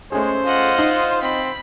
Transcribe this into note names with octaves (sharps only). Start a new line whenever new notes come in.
G#3 A3 C#4 G#4 C5
F4 D#5 F#5
D#4
C4 B5